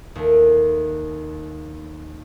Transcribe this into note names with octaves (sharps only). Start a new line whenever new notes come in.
D#2 A3